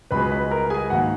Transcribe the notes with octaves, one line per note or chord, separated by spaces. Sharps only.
C#2 B2 G#3 B4 B5
B4 B5
A#4 A#5
G#4 G#5
G#2 D#3 A#3 F#4 F#5